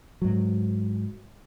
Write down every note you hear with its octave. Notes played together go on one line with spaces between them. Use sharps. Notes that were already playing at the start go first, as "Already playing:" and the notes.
G#2 F#3